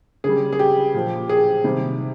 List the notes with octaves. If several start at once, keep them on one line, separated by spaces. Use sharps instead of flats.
C#3 G3 G#4
G#4
G4
A#2 F3
G#4
C3 D#3 G3